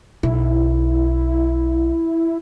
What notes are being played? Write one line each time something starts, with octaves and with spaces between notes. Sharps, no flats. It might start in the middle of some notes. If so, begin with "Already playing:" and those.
B1 E4